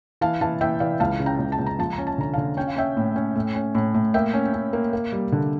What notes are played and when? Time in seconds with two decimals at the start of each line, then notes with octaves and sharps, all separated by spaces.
0.21 E3 F5 A5
0.41 E3 F5 A5
0.61 E3 E5 G5
0.80 E3 D5 F5
1.00 C#2 F5 A5
1.20 C#3
1.26 G5 A#5
1.39 C#2
1.52 A5
1.59 C#2
1.66 A#5
1.79 F3 A5
1.93 A#5
1.98 C#4
2.07 A5
2.18 D3 A#5
2.33 D3 F5 A5
2.57 C#4 G5
2.67 F5
2.76 C#4 E5 G5
2.97 A2
3.16 C#4
3.36 A2
3.55 C#4
3.75 A2
3.94 A2
4.14 A#3 E5 G5
4.34 C#4
4.53 C#4
4.73 A#3
4.93 A#3
5.12 G3
5.32 D3